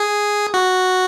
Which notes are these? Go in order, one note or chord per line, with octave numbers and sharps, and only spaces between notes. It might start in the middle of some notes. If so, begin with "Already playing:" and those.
Already playing: G#4
F#4